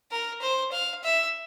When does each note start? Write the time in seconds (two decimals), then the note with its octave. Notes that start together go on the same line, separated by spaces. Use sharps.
0.11 A#4
0.42 C5
0.72 F5
1.04 E5